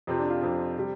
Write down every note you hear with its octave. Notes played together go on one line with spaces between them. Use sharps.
F2 C3 F3 C4
D4
F4
F2 C3 F3 D4
C3 G3